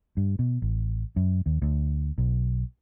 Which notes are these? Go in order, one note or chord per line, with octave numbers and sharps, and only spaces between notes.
G2
B2
A1
F#2
D#2
D2
B1